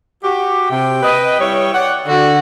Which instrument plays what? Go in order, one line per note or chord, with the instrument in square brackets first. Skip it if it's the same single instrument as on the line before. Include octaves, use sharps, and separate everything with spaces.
[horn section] F#4 G4
[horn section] C3 [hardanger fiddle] G5
[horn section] B4 D#5
G3 E4 C#5
C#5 D5 F#5
[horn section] D3 [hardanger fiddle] F#4